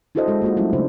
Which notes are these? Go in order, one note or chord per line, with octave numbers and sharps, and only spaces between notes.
D4 E4 F#4 A4 C5 D#5
G#3 F#4 A4
A#3 F4 F#4
F#3 G3 A3 C#4 E4 F#4
C#3 A3 D4 C5